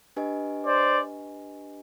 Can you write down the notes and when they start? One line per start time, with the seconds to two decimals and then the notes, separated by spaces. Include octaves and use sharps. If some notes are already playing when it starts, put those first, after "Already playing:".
0.17 D4 G4 B4 D#5 G#5
0.65 C5 D5